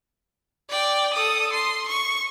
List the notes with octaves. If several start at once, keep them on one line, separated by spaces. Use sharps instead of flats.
D5 G5
A4 D#6
C6
C#6